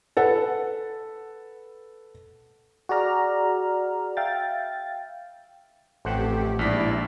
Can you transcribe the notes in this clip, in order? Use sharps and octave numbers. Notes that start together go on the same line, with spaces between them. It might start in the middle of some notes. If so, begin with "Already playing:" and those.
A4 B4 F#5
F#4 G#4 D5 A#5 F6
E5 F5 G5 A6
A1 F2 A3 G4 C5 F#5
A#1 G#2 E4 D5 B6